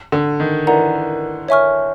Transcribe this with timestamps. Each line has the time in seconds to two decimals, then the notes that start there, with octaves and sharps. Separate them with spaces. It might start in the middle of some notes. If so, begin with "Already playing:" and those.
0.12 D3
0.40 D#3
0.67 E3 A#4 D5 F#5 A#5
1.48 C#5 E5 G#5 C#6 F6